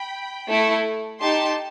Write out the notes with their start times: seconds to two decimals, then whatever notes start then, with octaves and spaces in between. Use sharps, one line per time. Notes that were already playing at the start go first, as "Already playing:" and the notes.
Already playing: G5 B5
0.48 A3 E4 A4
1.21 D#4 G4 A5 C6